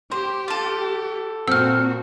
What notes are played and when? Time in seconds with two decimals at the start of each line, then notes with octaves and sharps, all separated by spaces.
0.12 G4 C5
0.48 F4 A4
1.48 A#2 C4 F#4 F#5 E6 F6